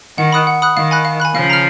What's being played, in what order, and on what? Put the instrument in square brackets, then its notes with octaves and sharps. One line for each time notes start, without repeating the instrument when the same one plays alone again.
[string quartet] D#3 [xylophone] F#5
[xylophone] B5 D#6 F#6
F#5
B5 D#6 F#6
[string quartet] D#3 [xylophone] F5
[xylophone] G#5 B5 F#6
F5
G#5 B5 F#6
[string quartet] C#3 F3 [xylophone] F5
[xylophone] A#5 F6